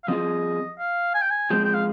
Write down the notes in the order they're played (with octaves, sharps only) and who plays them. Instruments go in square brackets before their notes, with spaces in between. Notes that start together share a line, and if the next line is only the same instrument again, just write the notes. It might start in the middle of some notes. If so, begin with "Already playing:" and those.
[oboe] F5
[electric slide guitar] F3 C4 F4 G#4 [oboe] D#5
[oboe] F5
G#5
G5
G#5
[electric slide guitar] F3 G#3 C4 [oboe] G5
[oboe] G5
F5